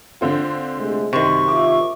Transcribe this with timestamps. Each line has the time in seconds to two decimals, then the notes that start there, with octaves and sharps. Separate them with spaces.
0.21 D3 C4 F4
0.78 C3 G#3 A3
1.13 F#2 C3 D#3 C6 C#6
1.48 F4 E5 D6